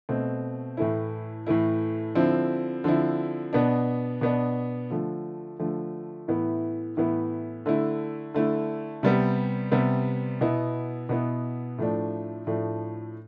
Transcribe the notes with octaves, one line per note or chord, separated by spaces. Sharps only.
B2 A3 C4
A2 E3 A3 E4
A2 E3 A3 E4
D3 F3 C4 E4
D3 F3 C4 E4
B2 B3 D4
B2 B3 D4
D3 F3 A3
D3 F3 A3
A2 E3 B3 E4
A2 E3 B3 E4
D3 A3 E4
D3 A3 E4
C3 G3 B3
C3 G3 B3
B2 B3 E4
B2 B3 E4
A2 F3 A3 D4
A2 F3 A3 D4